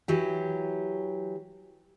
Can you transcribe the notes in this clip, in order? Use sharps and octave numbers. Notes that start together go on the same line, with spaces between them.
E3 F#3 G4